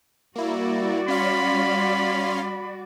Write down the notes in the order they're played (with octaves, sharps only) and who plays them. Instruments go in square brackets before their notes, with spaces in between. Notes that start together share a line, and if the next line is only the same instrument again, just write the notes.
[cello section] G3 F#4 D5 [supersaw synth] A#3 E4
[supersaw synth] C#4 F5 C6 [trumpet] B5